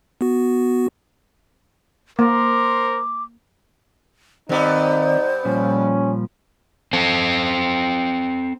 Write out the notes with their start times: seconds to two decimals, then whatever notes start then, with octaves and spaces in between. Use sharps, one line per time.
0.21 B3 F#4
2.19 A#3 A#4 C5 C6 D6
4.49 G2 D#3 B3 C4 D#4 C5 D5
5.45 A#2 F3 G3 C#4
6.93 C4 A4